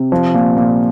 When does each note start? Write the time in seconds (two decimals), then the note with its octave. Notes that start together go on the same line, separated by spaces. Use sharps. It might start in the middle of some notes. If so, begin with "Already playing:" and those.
Already playing: C3
0.12 F3
0.34 A#2
0.57 A#2